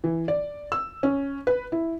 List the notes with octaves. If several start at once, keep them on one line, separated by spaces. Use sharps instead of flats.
E3
D5
E6
C#4
B4
E4